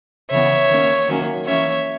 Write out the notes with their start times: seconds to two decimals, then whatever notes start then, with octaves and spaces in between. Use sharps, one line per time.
0.31 C#3 E3 B3 C#5 E5
0.70 D#3 A#3 C#4
1.08 D#3 F#3 A#3 C#4
1.46 E3 A#3 C#4 C#5 E5